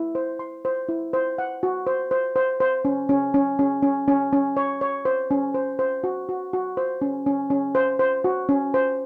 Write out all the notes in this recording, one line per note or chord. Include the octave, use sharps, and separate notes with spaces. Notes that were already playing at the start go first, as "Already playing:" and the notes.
Already playing: E4
C5
C6
C5
E4
C5
F#5
F#4
C5
C5
C5
C5
C#4
C#4
C#4
C#4
C#4
C#4
C#4
C#5
C#5
C5
C#4
C5
C5
F#4
F#4
F#4
C5
C#4
C#4
C#4
C5
C5
F#4
C#4
C5